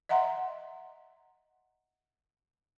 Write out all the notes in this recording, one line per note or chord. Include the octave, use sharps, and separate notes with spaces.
D#5 E5 F#5 A#5 C6